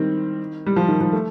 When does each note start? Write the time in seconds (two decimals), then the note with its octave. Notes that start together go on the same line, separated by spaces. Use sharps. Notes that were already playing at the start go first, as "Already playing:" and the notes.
Already playing: D#3 G3 C4
0.66 G3
0.76 F3
0.88 D#3
1.01 F3
1.13 A3